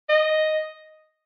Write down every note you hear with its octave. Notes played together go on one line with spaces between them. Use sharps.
D#5